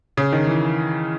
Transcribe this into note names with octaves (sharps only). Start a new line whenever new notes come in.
C#3
D#3
E3